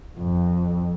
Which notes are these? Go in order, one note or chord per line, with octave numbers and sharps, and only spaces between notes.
F2